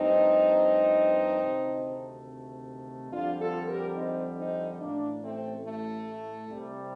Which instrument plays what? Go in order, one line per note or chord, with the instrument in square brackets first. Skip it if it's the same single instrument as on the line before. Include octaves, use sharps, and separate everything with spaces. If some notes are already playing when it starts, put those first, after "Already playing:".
Already playing: [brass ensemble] G2 F3 A3 C4 D#4
D2 C3 D#3 A3
F2 D3 G3 D4 F4
F4 A4
G4 A#4
C4 D#4
C4 D#4
A1 A2 A3 A#3 D4
A3 C4
A3
C2 C3 G3